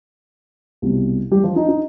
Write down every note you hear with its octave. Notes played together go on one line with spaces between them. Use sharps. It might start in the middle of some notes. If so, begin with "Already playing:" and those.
C2 B2 G3
G3 G4
F3 F4
D#4
D#4